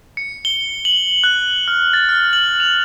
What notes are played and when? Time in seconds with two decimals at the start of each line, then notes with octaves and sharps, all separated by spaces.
0.17 C#7
0.45 G7
0.85 F#7
1.24 F#6
1.68 F6
1.93 A6
2.09 F6
2.33 F#7
2.60 F7